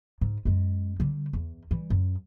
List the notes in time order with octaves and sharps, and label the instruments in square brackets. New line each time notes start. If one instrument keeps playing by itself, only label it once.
[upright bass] G#2
F#2 G#3
D3 G3
E2
E3 G3
F#2